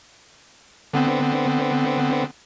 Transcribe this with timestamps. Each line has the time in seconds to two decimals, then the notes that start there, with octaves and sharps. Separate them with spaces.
0.93 D3 B3 C4